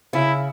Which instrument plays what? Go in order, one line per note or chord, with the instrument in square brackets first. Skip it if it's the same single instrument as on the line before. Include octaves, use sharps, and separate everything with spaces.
[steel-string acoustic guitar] C#3 [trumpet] E4